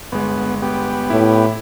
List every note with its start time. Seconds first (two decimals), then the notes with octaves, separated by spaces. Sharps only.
0.12 G1 G#3 B3
0.62 B3 G4
1.10 A2 E4